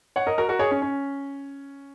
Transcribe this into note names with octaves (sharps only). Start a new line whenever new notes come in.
C#5 F#5
A#4 D#5
F#4 A#4
F#4 A#4
G#4 C#5
C#4
C#4